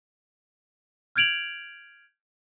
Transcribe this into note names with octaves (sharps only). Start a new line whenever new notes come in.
F6 G6 G#6 D7 F7 F#7